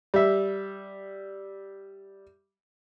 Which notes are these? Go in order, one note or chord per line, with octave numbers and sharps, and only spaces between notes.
G3 E5